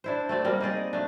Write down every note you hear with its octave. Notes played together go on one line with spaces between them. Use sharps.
D4 E4 C5
A3 C4 D5
G3 A#3 C4
D#4 G#4 D5 D#5
A3 D4